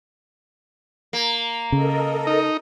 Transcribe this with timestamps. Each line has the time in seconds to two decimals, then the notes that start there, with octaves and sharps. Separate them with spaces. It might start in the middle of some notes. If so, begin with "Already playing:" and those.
1.13 A#3
1.72 C#3 A4 A#4 D#5
2.27 D#4